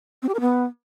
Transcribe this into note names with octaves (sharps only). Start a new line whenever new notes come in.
C4
G4
A#4
B3